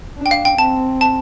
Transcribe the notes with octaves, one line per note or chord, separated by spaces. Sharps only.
D4
G5
F5
G5
C4 A5
A5